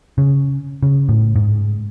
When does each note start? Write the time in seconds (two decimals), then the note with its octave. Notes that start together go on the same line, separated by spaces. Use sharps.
0.18 C#3
0.83 C#3
1.09 A2
1.36 G#2